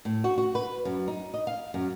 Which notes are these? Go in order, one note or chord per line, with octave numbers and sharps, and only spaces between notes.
A2
F#4
F#4
B4
F#2
D#4
D#5
F5
F#2